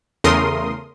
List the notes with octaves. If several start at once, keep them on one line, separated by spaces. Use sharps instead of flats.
E2 C#3 A3 A#4 C6 D#6